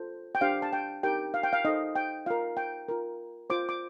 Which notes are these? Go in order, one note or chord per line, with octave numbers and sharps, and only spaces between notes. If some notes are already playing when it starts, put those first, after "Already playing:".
Already playing: F4 A4 C5
G5
D4 G4 C5 F5
A5
G5
D#4 G4 A#4 G5
F5
G5
F5
D#4 A4 C5 D#5
G5
F4 A#4 F5
G5
F4 A#4
F4 C5 D6
D6